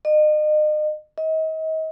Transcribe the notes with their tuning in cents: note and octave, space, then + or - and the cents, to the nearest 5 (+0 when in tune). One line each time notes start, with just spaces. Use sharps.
D#5 -35
D#5 +35